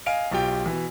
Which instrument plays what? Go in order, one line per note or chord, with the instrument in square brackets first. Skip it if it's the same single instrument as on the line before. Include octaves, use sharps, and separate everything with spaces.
[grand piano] D#5 F5 G#5 D7
B1 F4 G4 G5
B2 E3